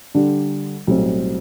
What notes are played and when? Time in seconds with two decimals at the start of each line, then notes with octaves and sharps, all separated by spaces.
0.15 D3 G3 D4
0.87 B1 A2 G3 C4